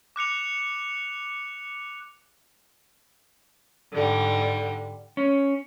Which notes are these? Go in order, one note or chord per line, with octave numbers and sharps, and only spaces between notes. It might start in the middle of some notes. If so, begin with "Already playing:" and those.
D6 F#6 C#7 F7
G#2 D3 G3
C#4